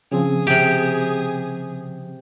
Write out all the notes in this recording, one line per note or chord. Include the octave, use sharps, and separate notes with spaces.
C#3 F3 C4 G#4
C3 G4